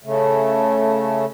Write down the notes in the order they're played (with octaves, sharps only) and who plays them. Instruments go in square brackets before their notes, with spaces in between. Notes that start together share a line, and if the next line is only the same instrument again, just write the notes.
[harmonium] C#3 A3